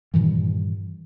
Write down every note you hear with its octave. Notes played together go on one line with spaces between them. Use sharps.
G2 A#2 D#3 E3